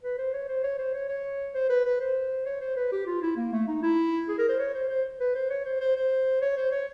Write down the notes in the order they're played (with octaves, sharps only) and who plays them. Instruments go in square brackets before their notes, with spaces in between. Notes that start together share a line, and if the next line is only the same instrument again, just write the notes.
[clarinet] B4
C5
C#5
C5
C#5
C5
C#5
C#5
C5
B4
B4
C5
C#5
C5
B4
G4
F4
E4
A#3
A3
D#4
E4
G#4
A#4
C5
C#5
C5
C5
B4
C5
C#5
C5
C5
C5
C#5
C5
C#5